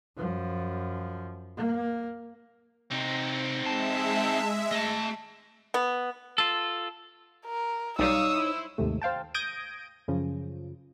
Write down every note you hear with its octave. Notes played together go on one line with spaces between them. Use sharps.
F#2 F3
A#3
C3 C4 D#4
G#3 E5 A5
A3 D#5 A5
B3
F4 A4
A#4
B1 G3 D#4 C#5 F5 C#6 D#6 E6
E4 C5
D#2 G#2 C3 A3
C5 F5 G5 A5
D#6 G6 G#6 A#6 D7 D#7
F#2 C#3 F3